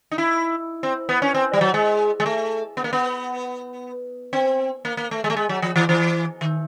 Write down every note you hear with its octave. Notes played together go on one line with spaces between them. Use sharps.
D#4
E4
C4
B3
C#4
C4
G3
F#3
G#3
G#3
A3
B3
A#3
B3
C4
A#3
A#3
A3
G#3
A3
G#3
F#3
F3
E3
E3
D#3